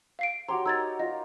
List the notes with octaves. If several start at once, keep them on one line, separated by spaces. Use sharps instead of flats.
F5 C7 D7
F#4 G4 C#5 A#5 C6
D#4 A#4 E6 G#6 A6
F4 D#5